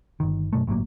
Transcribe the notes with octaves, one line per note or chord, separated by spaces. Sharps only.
G1 D#3
F#2 B2 A3
G1 A2 F#3 A#3